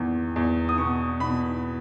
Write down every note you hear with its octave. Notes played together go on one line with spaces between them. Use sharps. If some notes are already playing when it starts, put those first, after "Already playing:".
Already playing: E2 D#3
E2
D#6
B2 C#6
B2 B5